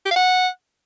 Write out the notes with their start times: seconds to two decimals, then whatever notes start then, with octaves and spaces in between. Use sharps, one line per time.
0.06 G4
0.11 F5
0.16 F#5